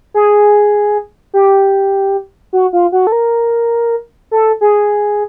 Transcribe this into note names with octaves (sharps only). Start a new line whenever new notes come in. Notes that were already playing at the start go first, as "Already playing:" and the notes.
G#4
G4
F#4
F4
F#4
A4
A#4
A4
G#4